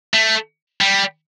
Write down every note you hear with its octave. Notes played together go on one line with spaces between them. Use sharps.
A3
G3